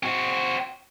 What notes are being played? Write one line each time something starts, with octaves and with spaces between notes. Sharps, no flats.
C4 F#4